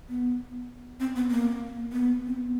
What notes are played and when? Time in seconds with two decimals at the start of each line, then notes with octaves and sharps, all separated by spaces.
0.09 B3
1.00 C4
1.16 B3
1.31 A#3
1.92 B3
2.27 C4
2.37 B3